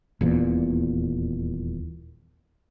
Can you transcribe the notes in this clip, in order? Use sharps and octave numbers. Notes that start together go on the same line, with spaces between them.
D#1 E2 A#2